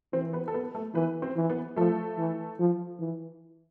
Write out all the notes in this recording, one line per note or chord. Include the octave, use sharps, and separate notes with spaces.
E3 C4 C5
B3 B4
A4
B3 B4
A3 A4
E3 B3 B4
C4 C5
E3
B3 B4
F3 A3 A4
E3
F3
E3